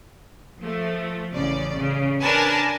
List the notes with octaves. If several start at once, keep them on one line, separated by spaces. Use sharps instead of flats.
F3 A3
A1 C#3 D5
C#3
D4 A#4 B4 G#5 A5